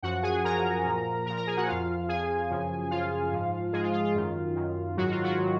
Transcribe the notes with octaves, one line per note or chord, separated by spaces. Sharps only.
F#2 F3 F#4 F#5
G#4 G#5
F#2 F3 A#4 A#5
A#2 F3
A#2 F3 A#4 A#5
A#4 A#5
G#4 G#5
F#4 F#5
F2 F3 F4 F5
F2 F3 G#4 G#5
F#2 C#3 F3
F#2 C#3 F3 F4 F5
G#2 F3
G#2 F3 G#3 G#4
F4
F4
F4
F#2 D#3
F#2 D#3
G#2 D#3 F#3 F#4
F4
F#3 F#4
D#3